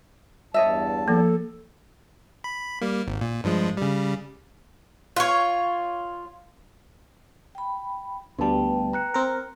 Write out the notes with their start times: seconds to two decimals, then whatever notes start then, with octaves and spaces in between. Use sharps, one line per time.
0.54 E2 G2 C#5 D#5 E5 A5
1.08 F3 A#3 A4
2.44 B5
2.81 G3 A#3
3.07 G#1
3.21 A#2
3.44 G2 F3 G#3
3.77 C#3 G3
5.16 F4 C#5
7.55 G5 B5
8.39 D2 G3 B3 B4 G5 A5
8.93 A#5 F#6 C#7
9.14 C4 A#4